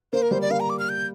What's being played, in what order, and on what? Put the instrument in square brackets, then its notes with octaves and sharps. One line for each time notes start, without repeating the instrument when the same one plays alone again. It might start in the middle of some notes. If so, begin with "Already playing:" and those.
[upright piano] A#3 [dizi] C5
[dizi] A#4
[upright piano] G3 [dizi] C5
[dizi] D5
[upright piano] A#3 [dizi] F5
[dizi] A#5
D6
F6
G6